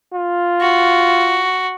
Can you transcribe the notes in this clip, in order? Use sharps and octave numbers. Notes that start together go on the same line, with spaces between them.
F4
F#4